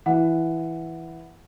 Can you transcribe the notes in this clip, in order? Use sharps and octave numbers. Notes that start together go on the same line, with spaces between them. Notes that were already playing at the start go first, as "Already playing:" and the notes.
E3 F#5